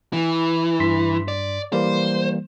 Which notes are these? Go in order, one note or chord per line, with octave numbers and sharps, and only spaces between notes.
E3
G2 C6 B6
D5
E3 G3 A#3 C5